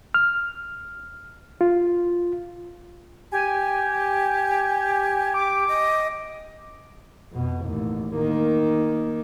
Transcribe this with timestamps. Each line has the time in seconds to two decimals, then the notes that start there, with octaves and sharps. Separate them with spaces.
0.14 F6
1.61 F4
3.32 G4 G#5
5.34 D6
5.68 D#5
7.31 F2 B2
7.64 A1 D#2
8.15 D#3 A#3